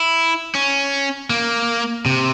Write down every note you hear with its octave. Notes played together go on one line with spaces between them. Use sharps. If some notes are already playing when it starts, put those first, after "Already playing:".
Already playing: E4
C#4
A#3
C3